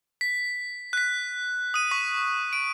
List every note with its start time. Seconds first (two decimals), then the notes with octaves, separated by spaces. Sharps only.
0.21 B6
0.93 F#6 B6
1.74 D#6 D#7
1.91 C#6 B6 D#7
2.53 D7